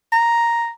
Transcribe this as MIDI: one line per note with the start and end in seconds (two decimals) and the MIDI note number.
0.12 0.69 82